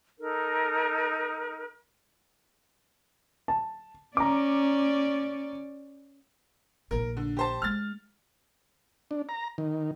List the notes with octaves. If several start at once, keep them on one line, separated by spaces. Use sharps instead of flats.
D#4 A4 A#4
A5
C#4 D5 A#5 D6
A#1 D#4 A#4
D3
G4 C5 A5
G#3 D4 F6 A6
D4
A#5
D#3